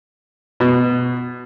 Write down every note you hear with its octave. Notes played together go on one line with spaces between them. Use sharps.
B2